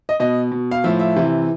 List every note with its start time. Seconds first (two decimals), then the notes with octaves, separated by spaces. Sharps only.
0.09 D#5
0.20 B2 D#5
0.52 B2
0.71 F5
0.84 A2 F3 E5
0.99 E5
1.16 C3 E3